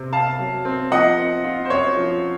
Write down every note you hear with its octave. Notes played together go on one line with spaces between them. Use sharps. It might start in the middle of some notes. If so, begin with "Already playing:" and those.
Already playing: C3 C4
C3 F5 A5
F#3
C4
F3 D#5 F#5
C4
F4
C5
F#2 C#5
F3